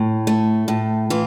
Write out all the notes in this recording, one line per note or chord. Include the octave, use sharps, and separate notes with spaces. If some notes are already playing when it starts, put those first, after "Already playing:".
Already playing: A2
A3
A2
E3 F4